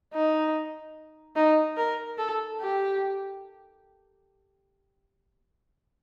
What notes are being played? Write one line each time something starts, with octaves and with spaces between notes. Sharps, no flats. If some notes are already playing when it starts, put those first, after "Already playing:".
D#4
D#4
A#4
A4
G4